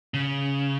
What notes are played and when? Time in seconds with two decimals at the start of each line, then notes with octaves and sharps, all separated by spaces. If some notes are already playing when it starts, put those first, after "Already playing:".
0.14 C#3